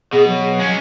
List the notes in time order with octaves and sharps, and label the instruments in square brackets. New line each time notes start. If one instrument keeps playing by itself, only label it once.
[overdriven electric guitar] B2 [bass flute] G#4
[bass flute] F#3
[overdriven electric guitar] G#3 C#4